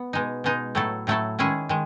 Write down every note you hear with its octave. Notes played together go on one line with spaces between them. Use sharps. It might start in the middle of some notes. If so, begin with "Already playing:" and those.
Already playing: B3
B2 G#3 D#4
B2 G#3 D#4
A2 F#3 A3 E4 A4
A2 F#3 A3 E4 A4
D#3 G#3 C#4 E4 G#4
D#3 G#3